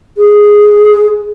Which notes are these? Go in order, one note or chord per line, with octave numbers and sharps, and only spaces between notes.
G#4